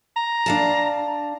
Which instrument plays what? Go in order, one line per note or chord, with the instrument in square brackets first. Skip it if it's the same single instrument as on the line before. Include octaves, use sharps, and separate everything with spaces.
[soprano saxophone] A#5
[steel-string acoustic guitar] D4 F5 A5